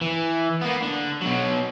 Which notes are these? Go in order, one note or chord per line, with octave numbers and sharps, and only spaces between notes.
E3
A#3 B3
D3
B2 F#3